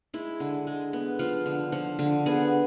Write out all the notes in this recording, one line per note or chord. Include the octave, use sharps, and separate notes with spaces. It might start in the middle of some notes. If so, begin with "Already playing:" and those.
G#3 E4
D3
G#3
B3
F3 F4
D3
F3
D3
B3 G#4